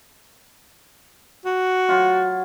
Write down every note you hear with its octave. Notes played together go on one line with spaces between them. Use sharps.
F#4
F#3 F4